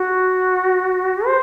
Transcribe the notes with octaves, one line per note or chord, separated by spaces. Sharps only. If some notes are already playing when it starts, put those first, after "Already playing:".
Already playing: F#4
C5